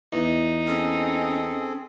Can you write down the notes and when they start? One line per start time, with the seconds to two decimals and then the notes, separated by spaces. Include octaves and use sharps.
0.13 E2 D#4
0.67 C4 C#4 G#4 A4